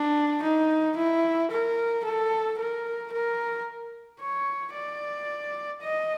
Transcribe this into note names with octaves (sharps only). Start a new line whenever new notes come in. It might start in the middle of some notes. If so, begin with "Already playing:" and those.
Already playing: D4
D#4
E4
A#4
A4
A#4
A#4
C#5
D5
D#5